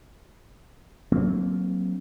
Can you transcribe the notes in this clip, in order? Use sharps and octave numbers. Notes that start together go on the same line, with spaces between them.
F#3 A#3 C4 D4